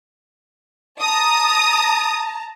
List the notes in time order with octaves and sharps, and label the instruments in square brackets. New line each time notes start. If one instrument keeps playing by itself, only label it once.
[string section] A5 A#5 [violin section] D#6